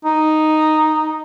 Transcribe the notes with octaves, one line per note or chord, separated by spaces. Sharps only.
D#4